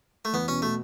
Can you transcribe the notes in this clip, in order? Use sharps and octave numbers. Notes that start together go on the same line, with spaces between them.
A3
E2 B3
B2 C#4
B2 A3